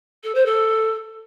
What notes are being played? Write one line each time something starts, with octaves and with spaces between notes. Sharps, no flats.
A4
C5
A4